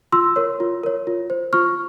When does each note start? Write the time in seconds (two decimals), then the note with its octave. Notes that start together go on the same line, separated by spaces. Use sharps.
0.12 F4 C6 E6
0.36 A#4 C#5
0.60 F4
0.84 A#4 C#5
1.07 F4
1.30 C5
1.53 F4 C#6 F6